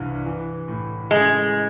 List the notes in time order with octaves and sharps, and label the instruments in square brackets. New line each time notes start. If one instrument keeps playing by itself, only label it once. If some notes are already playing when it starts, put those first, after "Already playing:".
Already playing: [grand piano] C2 G2 E3
E3
A2
[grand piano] C#3 [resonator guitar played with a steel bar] G#3